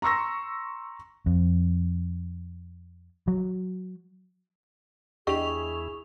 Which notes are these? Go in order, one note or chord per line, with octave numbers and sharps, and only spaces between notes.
A#5 C6 C#6 E6 A#6
F2
F#3
E2 D4 E4 G4 G#4 D#5 C#6 F7